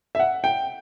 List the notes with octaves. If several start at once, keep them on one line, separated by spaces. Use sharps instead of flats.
E5
F#5
G5